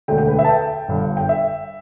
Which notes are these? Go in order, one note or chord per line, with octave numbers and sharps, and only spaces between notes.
E1 D2 D3 A3 G5
G5
B4
E5
A5
G5
G1 G2 D3
G5
E5